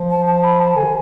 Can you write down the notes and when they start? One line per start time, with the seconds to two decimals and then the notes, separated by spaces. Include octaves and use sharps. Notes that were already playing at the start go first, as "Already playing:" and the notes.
Already playing: F3
0.10 A5
0.26 A5
0.44 B5
0.60 A5
0.75 D3 G#5
0.84 D#3